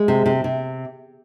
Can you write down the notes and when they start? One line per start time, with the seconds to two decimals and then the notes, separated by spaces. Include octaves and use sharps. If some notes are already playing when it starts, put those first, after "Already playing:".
Already playing: G#3
0.08 C3
0.26 C3
0.44 C3